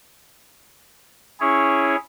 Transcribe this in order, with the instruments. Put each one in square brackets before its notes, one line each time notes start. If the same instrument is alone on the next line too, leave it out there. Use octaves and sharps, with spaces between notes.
[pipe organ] C#4 E4 G#4 C#5